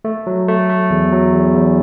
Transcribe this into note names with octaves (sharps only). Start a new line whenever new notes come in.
A3
F#3
A3
A3
E2
F#3
E2
E2